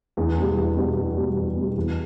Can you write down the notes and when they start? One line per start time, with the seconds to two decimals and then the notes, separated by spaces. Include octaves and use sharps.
0.17 E2
0.37 B2 G3
0.57 E2
0.77 B2 G3
0.97 E2
1.17 B2 G3
1.37 E2
1.56 B2 G3
1.77 E2